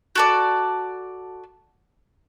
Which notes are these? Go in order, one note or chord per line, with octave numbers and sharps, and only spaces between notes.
F#4 A4 D5